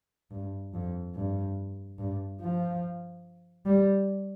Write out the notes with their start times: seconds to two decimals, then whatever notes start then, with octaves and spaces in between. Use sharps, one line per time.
0.31 G2
0.74 F2
1.15 G2
1.98 G2
2.41 F3
3.66 G3